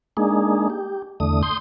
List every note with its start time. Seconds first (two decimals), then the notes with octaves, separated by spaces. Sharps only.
0.17 G#3 A#3 D4 D#4 G#4
0.70 G4
1.20 E2 D3 A3 D#6
1.43 C6 D#6 G6